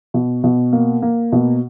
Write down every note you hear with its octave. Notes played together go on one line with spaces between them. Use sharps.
B2
B2
A#3
A#3
B2